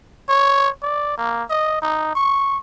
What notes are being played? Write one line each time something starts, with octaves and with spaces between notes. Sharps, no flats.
C#5
D5
A#3
D#5
D#4
C#6